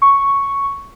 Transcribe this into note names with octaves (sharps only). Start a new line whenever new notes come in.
C#6